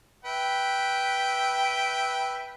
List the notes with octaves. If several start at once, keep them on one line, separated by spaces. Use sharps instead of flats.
B4 E5 G5